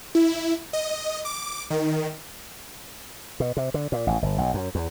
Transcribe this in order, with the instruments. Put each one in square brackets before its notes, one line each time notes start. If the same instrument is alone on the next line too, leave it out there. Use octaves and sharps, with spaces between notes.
[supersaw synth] E4
D#5
D6
D#3
[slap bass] B2
C3
D3
A#2
A1
G1
B1
F#2
E2